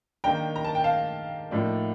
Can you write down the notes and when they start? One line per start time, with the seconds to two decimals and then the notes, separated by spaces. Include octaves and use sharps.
0.24 D#3 A#3 D4 G5 A#5
0.56 A#5
0.64 A5
0.75 G5
0.84 F5 A5
1.51 A2 F3 A#3 D#4 D5